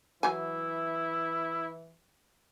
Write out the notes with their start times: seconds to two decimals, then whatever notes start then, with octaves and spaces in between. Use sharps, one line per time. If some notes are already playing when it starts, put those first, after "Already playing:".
0.23 E3 F#3 E4 G#5